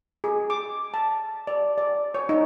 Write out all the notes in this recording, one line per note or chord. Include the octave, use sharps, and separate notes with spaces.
G#4
D6
A5
D5
D5
C#5
D#4